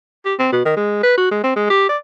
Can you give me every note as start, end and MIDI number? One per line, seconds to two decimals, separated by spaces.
0.25 0.34 67
0.39 0.47 60
0.52 0.61 47
0.65 0.73 51
0.77 1.01 56
1.03 1.15 71
1.17 1.30 66
1.31 1.41 56
1.44 1.54 60
1.56 1.65 56
1.70 1.87 67
1.89 1.97 74